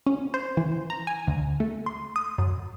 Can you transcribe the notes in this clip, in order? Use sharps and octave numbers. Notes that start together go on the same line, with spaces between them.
C#4
C5
E3
A#5
G#5
D2
A3
C6
D#6
F#2